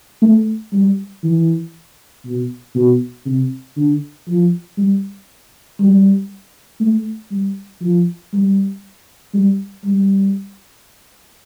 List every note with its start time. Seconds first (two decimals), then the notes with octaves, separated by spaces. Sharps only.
0.22 A3
0.73 G3
1.24 E3
2.25 B2
2.75 B2
3.26 C3
3.77 D3
4.28 F3
4.78 G3
5.80 G3
6.81 A3
7.31 G3
7.82 F3
8.33 G3
9.34 G3
9.84 G3